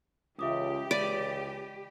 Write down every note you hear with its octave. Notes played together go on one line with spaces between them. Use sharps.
C#2 E3 G4 E5 D6 D#6
C#2 D5 B5 B6 D#7